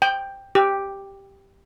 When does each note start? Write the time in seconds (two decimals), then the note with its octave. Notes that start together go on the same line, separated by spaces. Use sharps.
0.02 G5
0.55 G4